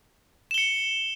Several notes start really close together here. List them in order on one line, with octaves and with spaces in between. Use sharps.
E7 G7 C#7